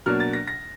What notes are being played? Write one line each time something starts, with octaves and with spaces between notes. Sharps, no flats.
B2 F#3 A#3 D4 F6
A6
A#6
A#6